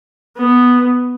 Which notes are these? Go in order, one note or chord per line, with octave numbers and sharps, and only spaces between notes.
B3